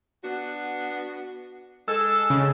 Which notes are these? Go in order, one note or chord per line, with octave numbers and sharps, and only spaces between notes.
B3 D4 F#4
G#3 A4 E6
C#3